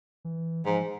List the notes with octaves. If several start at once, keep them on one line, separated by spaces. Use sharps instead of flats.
E3
G#2 F3